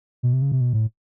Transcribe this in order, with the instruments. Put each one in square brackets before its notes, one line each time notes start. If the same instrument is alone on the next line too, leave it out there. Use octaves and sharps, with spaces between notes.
[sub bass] B2
C3
C#3
C3
B2
A2